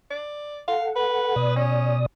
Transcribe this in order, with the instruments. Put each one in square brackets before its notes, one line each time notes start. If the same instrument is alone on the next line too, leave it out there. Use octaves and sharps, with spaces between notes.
[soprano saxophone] D5
[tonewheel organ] A4 F#5 [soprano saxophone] F5
[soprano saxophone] B4
[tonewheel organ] B2 D5 D#6
[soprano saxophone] C#4